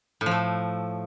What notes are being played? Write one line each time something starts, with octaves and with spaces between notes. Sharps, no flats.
A2
F3
A3